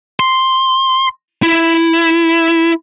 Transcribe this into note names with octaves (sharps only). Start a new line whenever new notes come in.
C6
E4